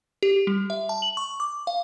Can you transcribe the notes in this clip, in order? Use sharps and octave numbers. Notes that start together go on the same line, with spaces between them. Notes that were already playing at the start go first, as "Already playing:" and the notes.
G4
G3
E5
A5
F#7
C#6
D6
F5